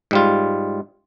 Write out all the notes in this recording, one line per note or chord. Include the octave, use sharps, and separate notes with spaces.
G#2 G3 F4